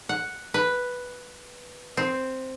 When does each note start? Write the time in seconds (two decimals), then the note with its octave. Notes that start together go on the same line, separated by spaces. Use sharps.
0.09 F#5
0.54 B4
1.97 C4